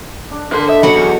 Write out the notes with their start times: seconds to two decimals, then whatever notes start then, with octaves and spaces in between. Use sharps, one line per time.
0.31 D4
0.52 D3 A#4 C6
0.69 D#5 E5
0.83 F#3 F#4 B5
0.95 E2